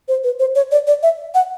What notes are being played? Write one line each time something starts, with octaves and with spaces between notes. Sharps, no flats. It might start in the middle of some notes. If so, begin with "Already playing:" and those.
C5
B4
C5
C#5
D5
D5
E5
F#5